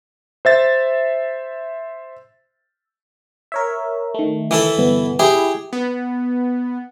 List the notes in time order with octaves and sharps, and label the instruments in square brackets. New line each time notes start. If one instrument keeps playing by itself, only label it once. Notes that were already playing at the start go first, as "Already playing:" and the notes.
[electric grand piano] C5 E5 A6
[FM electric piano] A#4 C#5 E5
D#3 A3
[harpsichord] E3 E4 A4
[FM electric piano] G1 B2 B3
[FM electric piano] E4 [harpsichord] G4 G#4
[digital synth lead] B3